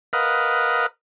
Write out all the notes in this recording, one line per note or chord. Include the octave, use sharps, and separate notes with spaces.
A#4 B4 D#5 F5 F#5